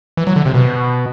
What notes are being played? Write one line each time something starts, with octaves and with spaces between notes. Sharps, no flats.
E3
F#3
D3
C3
B2